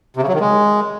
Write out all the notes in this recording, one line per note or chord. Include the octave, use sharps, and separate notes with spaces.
C3
C#3
F#3
D#3
G#3